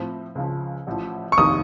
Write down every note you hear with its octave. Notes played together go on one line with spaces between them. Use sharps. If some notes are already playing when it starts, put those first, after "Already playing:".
Already playing: A2 F3 C4
C#2 C#3 F3
A1 A2 F3
C#6
F1 D#2 D#3 A#3 D#4 D#6